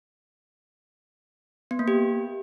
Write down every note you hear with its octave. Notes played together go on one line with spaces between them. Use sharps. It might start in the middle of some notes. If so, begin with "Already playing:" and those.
B3
A#3
G4